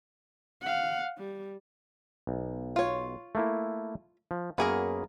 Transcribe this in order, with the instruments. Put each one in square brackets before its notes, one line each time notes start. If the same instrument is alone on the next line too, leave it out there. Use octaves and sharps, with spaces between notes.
[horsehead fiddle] F5 F#5
G3
[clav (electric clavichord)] B1
[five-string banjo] F4 C#5
[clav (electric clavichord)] A3 A#3 E4
F3
[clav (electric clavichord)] F#2 A#3 C#5 [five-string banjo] B3 G#4 A#4